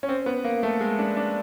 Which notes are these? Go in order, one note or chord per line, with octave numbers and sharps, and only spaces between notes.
C#4
C4
B3
A#3
A3
G#3
D4
D4